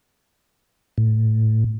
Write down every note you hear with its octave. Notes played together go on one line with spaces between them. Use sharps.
A2